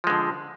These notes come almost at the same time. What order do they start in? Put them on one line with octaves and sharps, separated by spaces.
F3 G#3 D3